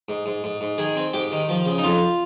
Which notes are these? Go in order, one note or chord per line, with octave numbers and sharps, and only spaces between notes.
G#2
G#2
G#2
G#2
D#3 G#4
C4
G#2 G4
D#3
F3
C#3
D#4
F2 F4